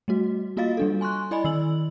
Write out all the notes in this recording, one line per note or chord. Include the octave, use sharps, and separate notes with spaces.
G3 A3 F#4
A#3 F4 F#4 D#5 F5 A6
G3 D4 A4
G#5 C6 C#6 F#6
E4 D5 D#5 G#5 B5
D#3 E6 F#7